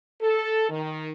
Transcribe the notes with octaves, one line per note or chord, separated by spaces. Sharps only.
A4
D#3